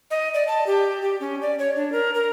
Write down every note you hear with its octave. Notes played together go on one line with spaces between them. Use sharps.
D#5
D5
A5
G4
G4
C#4
D5
C#5
D4
A#4
A#4